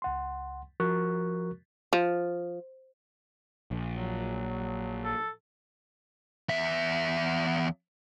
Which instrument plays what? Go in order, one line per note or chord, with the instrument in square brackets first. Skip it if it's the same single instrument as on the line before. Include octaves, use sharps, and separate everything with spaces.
[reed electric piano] C#2 F#5 C6
F3 F#4 A#4 C#6 F#6
[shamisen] F3
[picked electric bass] A#1
[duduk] F#3
[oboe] A4
[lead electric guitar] E2 E5